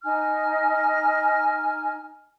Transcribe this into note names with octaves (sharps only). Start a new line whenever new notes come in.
D#4 G#5 F6